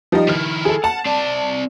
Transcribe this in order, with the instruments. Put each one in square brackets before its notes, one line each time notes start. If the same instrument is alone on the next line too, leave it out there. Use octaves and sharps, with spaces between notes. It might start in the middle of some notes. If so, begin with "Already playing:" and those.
[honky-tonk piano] F3 G3 D#4
[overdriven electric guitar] D#3 E4 [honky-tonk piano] F6
[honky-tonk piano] G#4 A4
[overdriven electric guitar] F#5 [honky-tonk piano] A5
[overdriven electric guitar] C4 D5